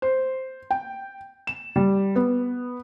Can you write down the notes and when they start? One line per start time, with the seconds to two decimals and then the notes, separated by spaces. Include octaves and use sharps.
0.02 C5
0.71 G5
1.47 E7
1.76 G3
2.15 B3